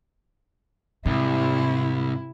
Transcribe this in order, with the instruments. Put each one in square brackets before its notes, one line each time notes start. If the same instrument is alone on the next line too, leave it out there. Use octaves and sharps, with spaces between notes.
[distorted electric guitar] C2 [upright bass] G#2 [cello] C3 E4